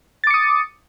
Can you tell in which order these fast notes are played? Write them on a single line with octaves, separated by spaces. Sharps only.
A6 D6 C#7 D#6